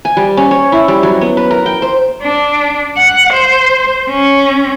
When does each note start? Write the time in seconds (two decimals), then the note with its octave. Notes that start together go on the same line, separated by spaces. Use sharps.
0.05 G#5
0.17 G3
0.37 C#4
0.51 C#5
0.72 E4
0.88 G3
1.03 F#3
1.21 B3
1.37 B4
1.51 A#4
1.66 G5
1.82 C5
2.22 D4
2.97 F#5
3.34 C5
4.10 C#4